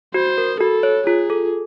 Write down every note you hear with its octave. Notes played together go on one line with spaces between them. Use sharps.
F#4 C5
A#4
F#4 A4
C#5
F4 G#4
A4